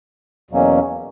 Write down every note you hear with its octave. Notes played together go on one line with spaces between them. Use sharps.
E2 B2 F#3 A#3 C#4